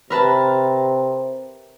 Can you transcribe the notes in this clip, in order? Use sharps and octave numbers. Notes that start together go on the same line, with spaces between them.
C3 A#4 B4 A5